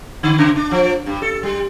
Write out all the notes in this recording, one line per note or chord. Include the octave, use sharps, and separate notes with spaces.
D3
C#3
D4
F3
G2
A4
G3